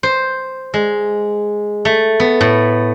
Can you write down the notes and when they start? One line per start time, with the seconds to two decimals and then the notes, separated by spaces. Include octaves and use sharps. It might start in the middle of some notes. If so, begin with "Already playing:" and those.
0.03 C5
0.74 G#3
1.85 A3
2.20 B3
2.41 A2